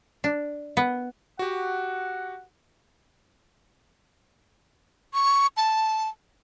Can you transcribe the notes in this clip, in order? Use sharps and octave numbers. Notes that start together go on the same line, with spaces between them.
D4
B3
F#4 G4 F#5
C#6
A5